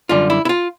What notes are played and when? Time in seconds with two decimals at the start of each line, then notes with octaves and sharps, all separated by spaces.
0.09 F#2 D3 G3 F4
0.30 E4
0.45 E4
0.49 F4